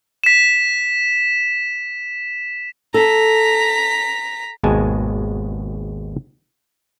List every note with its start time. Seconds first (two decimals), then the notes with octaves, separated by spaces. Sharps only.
0.24 B6 E7
2.94 A4 A#5 B6
4.63 G#1 D#2 B2 G#3 G#5 A5